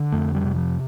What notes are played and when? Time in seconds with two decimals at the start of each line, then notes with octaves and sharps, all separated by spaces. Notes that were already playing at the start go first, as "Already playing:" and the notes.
Already playing: D3
0.12 F2 A3
0.35 G3
0.45 C3
0.56 F3